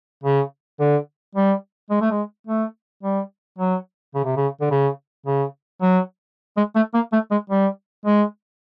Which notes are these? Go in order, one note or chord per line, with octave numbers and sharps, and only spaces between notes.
C#3
D3
G3
G#3
A3
G#3
A3
G3
F#3
C#3
C3
C#3
D3
C#3
C#3
F#3
G#3
A3
A#3
A3
G#3
G3
G#3